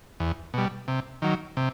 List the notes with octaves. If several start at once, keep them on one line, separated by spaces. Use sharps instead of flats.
E2
B2 G3
C3
D#3 F#3
C3